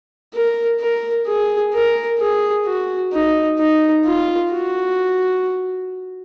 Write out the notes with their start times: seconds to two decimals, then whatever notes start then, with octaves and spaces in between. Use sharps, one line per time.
0.34 A#4
0.80 A#4
1.27 G#4
1.73 A#4
2.19 G#4
2.66 F#4
3.12 D#4
3.59 D#4
4.05 F4
4.52 F#4